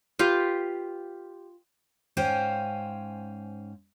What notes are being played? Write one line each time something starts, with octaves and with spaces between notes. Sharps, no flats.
F4 G4 B4 F5
G#2 C#4 C5 F5 G5 G#5